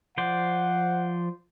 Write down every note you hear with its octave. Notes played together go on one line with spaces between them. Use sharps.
F3 C5 D5 F#5